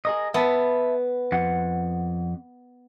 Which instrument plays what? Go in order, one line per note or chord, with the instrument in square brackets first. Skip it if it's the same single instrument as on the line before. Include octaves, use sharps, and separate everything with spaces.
[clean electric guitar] G#4 A#4 D#5
[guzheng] B3 [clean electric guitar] E5 A5
[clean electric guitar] F2 F#5